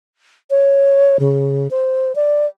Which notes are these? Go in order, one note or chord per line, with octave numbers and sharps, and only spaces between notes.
C#5
C#3
C5
D5